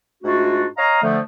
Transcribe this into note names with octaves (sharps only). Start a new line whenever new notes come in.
G#2 A3 D4 F4 F#4
C#5 D#5 F5 A#5
D3 F3 A3